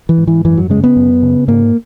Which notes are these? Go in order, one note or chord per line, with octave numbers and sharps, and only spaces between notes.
E3
G#2
E3
F#2 E3
F#3
C#3 G#3
B3
F#2
C#3
G#2 A#3